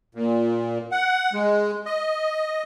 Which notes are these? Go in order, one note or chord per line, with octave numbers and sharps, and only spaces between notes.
A#2
F#5
G#3
D#5